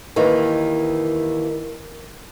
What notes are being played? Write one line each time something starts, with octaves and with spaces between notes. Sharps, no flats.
D#2 D#3 E3